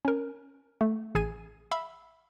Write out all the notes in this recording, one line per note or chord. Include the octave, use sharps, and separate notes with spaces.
C#4 A#4
A3
A1 G#4 G#5 G#6 D#7
E5 F5 B5 E6